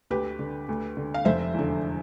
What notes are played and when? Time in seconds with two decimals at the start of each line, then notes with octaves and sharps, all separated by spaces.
0.10 D2 G4 B4
0.39 D3
0.69 D2
0.97 D3
1.14 F5
1.25 F1 C5 E5
1.54 E2 D3